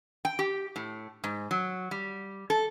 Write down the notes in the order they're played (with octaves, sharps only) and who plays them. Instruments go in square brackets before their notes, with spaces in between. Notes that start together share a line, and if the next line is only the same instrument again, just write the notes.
[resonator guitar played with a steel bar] G5
G4
A2
G#2
F#3
G3
A4